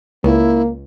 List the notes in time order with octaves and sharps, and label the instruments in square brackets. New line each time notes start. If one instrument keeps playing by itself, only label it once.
[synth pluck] C#2 [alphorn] A#3 [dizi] E4